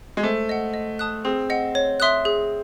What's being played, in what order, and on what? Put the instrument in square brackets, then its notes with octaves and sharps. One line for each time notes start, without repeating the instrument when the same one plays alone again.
[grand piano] G#3
[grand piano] A3 [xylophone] C5
[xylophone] D#5 F#5
D#5
A5 D#6 F#6
[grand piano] C4 [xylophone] G#4
[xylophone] D#5 F#5
C#5
E5 C6 D#6 F#6
G#4